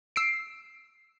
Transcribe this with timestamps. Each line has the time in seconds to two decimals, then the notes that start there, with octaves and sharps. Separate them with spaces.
0.16 E6 C7 D7